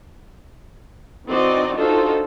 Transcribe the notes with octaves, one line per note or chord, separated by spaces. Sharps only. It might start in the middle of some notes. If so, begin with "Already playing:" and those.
E3 C4 D#4 F#4 D5 D#5
D4 D#4 F4 F#4 A4 C5